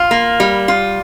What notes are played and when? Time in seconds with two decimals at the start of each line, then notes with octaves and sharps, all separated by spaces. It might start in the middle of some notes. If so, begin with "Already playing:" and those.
Already playing: F4
0.11 A#3
0.40 G3
0.68 F4